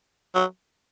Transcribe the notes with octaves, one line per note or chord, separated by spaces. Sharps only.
F#3